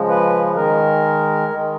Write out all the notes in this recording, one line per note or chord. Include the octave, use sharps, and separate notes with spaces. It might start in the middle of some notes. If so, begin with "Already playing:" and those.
Already playing: C#3 F3 G#3
B4
D#3 G#3 A#4
D#3 G#3